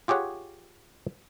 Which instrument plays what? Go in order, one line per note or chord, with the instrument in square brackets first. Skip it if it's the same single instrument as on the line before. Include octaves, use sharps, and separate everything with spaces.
[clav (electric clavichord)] F4 G4 G#4 C#5 F#5